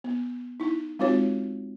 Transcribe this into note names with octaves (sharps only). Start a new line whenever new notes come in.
B3
D#4 E4
G#3 C4 D#4 F4 F#4 C#5